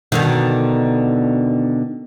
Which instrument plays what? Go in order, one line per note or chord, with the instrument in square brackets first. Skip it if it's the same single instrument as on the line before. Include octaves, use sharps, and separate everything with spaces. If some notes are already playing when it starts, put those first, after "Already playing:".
[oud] B2 D3 D#3